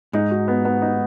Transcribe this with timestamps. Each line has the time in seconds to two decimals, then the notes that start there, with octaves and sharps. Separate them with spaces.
0.13 G#2 D#4
0.31 F#4
0.48 B3
0.65 B3
0.82 D#4